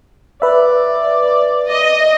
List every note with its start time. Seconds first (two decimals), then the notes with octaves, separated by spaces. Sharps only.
0.42 B4 D5 E5
1.69 D#5